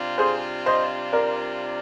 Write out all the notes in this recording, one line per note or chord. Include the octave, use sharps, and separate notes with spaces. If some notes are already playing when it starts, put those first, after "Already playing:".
Already playing: C3 G3 D4 F4
G#4 C5
C5 D#5
A#4 D5